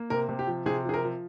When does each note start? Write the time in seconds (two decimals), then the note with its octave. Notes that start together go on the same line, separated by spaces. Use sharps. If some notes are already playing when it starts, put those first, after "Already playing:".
Already playing: A#3
0.10 C3 A#4
0.29 C3
0.39 G4
0.47 F3
0.66 C3 G#4
0.84 F3 G#4
0.94 A#4
1.04 F3